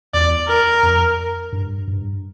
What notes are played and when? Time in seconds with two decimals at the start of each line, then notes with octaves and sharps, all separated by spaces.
0.14 E2 D5
0.48 A#4
0.83 F2
1.52 G2
1.87 G2